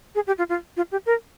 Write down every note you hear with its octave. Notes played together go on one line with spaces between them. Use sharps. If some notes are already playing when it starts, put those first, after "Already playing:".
G#4
G4
F4
F4
F4
G4
A#4